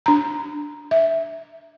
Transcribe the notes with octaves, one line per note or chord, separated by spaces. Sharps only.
D4 A#5
E5